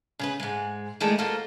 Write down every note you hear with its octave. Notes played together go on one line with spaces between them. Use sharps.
C#3 G#4 B4
G#2 G#3
D#3 G#3 A3 E4 G#4 D5
A#3 F4 F#4 A4 C5